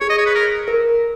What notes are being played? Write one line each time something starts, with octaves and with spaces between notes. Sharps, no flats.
G#4 C#5
D#5
C#5
B4
A#4
A#4